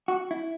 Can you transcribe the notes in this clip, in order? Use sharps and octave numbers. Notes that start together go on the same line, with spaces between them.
F#4
E4